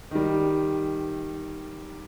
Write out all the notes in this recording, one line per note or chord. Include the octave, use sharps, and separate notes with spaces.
D#3 G3